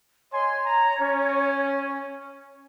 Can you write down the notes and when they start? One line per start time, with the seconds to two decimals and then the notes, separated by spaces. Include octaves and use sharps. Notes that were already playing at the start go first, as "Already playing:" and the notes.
0.32 C#5 D#5 G#5 C6
0.66 A#5
1.00 C#4